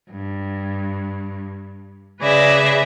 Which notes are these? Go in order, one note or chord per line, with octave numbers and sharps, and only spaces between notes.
G2
C#3 G#4 B4 D5 E5 A#6